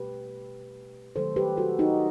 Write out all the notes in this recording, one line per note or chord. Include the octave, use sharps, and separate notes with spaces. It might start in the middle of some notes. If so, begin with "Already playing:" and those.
Already playing: B2 A3 G4 B4
D#3 F#3 A3 A4 C5
G4 B4
F#4 A4
D#4 F#4